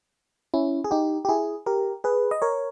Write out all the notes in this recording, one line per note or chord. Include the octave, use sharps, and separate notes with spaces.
C#4 E4
G#4
D#4 G4
G4
E4 G#4
G4 A#4
G#4 B4
D#5
A#4 C#5